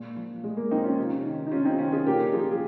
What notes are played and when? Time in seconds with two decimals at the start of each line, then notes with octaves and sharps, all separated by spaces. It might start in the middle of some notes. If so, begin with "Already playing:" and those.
Already playing: A#2 G#3
0.16 F3
0.43 A#2 G#3
0.57 A#3
0.70 F3 C4 D#4
0.84 C#4 F4
0.98 C3
1.25 D#3
1.47 D#4
1.51 C3 C#4 F4
1.65 C4 D#4
1.78 D#3 C#4 F4
1.92 F4 G#4
2.06 A#2 G4 A#4
2.33 F3 F4 G#4
2.51 G#4